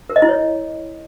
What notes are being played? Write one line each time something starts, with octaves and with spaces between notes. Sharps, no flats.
A#4
D#5
E4
C#5